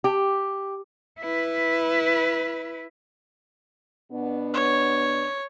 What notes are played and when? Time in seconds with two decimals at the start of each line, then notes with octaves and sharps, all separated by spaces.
0.04 G4
1.20 E4 B4
4.11 B2 B3 D4
4.54 C#5